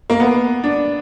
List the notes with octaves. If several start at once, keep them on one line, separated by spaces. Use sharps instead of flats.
A#3
B3
D4